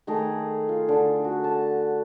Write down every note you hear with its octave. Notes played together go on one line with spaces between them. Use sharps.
D#3 A3 G#4 A#5
F4
D3
F#4
A5